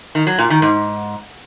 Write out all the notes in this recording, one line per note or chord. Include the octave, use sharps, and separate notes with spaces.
D#3
F#3
A#2
D#3
G#2